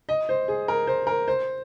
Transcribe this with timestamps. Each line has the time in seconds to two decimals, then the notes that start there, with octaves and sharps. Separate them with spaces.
0.09 D#5
0.29 C5
0.48 G#4
0.68 A#4
0.87 C5
1.07 A#4
1.28 C5